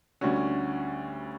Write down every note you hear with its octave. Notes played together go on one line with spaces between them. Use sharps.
D2 D3 G3 C#4 F#4